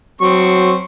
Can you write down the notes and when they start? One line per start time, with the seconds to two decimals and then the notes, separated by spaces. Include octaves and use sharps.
0.21 F#3 C4 C#6